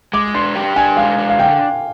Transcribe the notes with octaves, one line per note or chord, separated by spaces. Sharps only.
G#3 D6
D4 C6
G4
D4 G#5
G#3 F5
D4
F5
D3 G5